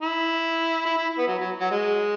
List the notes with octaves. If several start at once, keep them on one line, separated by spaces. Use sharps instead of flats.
E4
E4
E4
B3
F#3
F#3
F#3
G#3